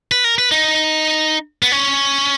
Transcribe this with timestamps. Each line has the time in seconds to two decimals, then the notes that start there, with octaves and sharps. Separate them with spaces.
0.12 B4
0.24 A#4
0.38 B4
0.51 D#4
1.63 B3
1.72 C#4